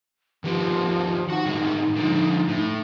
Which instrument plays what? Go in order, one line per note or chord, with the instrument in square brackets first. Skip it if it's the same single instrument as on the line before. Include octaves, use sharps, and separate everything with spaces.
[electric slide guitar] D#3 G4 B4 [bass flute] F3
[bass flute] D#4 [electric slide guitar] F#4 F#5
[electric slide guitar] A2 D#3 G#3
D3 D#3 F3
A2